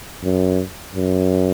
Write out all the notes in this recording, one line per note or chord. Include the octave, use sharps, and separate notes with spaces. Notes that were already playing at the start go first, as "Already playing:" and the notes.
F#2
F#2